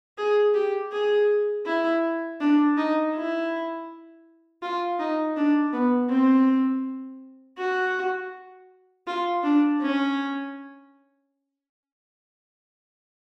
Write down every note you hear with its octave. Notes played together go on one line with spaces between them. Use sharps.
G#4
G4
G#4
E4
D4
D#4
E4
F4
D#4
D4
B3
C4
F#4
F4
D4
C#4